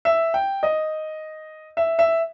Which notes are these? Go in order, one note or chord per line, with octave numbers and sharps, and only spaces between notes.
E5
G5
D#5
E5
E5